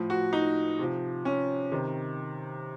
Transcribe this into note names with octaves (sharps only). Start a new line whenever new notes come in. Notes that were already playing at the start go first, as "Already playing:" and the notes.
Already playing: A2 F3
F#4
D#4
C3 F3
C#4
C3 D#3